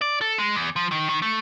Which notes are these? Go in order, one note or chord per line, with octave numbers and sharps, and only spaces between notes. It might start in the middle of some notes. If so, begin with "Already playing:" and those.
D5
A4
G#3
E2
F3
D#3
D#3
A3